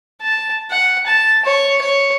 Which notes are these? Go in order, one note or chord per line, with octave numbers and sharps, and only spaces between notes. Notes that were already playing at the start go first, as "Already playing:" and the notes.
A5
F#5
A5
C#5
C#5